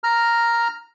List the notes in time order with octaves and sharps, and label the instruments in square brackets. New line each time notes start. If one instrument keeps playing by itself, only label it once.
[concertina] A#5 F6